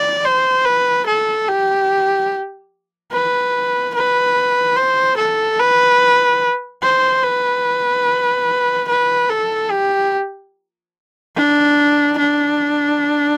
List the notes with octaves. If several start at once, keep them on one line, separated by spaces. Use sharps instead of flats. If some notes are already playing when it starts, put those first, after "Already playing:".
Already playing: D5
C5
B4
A4
G4
B4
B4
C5
A4
B4
C5
B4
B4
A4
G4
D4
D4